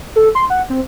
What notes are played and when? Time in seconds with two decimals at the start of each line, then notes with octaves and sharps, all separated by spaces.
0.16 A4
0.35 C6
0.50 F#5
0.70 C4